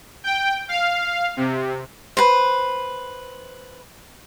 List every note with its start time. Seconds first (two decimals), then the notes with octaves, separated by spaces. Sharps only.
0.24 G5
0.69 F5
1.37 C3
2.17 B4 C5